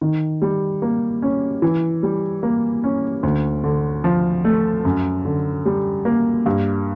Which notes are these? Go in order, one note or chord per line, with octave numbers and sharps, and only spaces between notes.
D#3
G3
A#3
C#4
E3
G3
A#3
C#4
D2
D3
F3
A3
F#2
D3
G3
A#3
G2